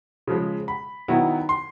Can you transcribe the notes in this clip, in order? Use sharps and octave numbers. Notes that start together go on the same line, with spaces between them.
C#3 F3 G#3
B5
D#3 F#3 B3 E4
C6